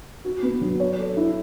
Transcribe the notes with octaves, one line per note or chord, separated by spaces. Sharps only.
F#4
B3
F#3
C#5
A4
E4